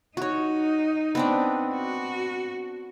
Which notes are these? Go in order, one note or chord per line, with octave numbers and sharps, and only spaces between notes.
D#4 F#4 C#5
B3 C4 D4
F#4